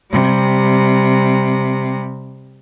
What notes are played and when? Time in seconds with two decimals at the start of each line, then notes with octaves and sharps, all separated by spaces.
0.11 C3 G3